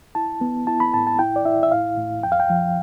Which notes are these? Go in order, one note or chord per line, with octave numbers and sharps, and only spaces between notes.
E4 A5
B3
E4 A5
B5
A2 A5
A5
E4 G5
D5
E4 E5
E5
A2 F5
A2
F2 G5
F5
G5
F3